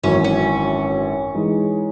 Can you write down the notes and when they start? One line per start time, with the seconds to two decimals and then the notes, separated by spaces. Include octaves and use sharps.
0.03 G#1 F#2 E3 C#4
0.24 C#4
1.35 E3 G#3 D#4 G#4